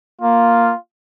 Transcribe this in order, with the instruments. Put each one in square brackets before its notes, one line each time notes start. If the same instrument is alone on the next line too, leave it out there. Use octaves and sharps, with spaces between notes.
[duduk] A#3 [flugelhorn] F4